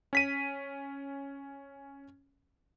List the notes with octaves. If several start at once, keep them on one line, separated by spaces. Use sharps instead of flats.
C#4 B6 D#7